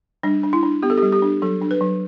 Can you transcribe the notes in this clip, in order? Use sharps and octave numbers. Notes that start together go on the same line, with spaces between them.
G3 D4
D4
E4
D4
B3 G4
A4
G3 G4
G4
D4
F#3 A4
D4
B4
F#3